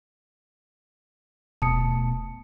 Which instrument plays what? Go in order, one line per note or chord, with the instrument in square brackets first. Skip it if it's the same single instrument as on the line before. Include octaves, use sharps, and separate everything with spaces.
[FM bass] D#1 [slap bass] B2 A3 [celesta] A5 D#6 C#7